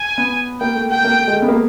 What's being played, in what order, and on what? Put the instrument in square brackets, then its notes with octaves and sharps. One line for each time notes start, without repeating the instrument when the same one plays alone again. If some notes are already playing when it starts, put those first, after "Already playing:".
Already playing: [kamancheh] G#5
[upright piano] B3
[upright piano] A#3 [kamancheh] G5
[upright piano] A3
[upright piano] A3 [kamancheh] G5
[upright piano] A#3
A3
G#3
A3
B3
A#3